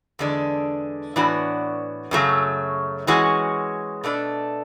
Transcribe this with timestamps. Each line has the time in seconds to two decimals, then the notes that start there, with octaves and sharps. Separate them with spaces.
0.19 E2 D3 G#3 D4
1.16 A2 E3 B3 D4 F#4
2.11 F#2 C#3 F#3 A3
3.07 E3 G#3 C#4 F#4
4.04 B2 A3 D4 A4